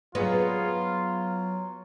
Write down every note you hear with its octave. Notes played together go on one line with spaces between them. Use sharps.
F#3 B3 F4 G#4 C#5 D#5